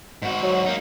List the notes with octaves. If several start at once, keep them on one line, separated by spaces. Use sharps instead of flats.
G#2 F#4
F#3
A#3 D#4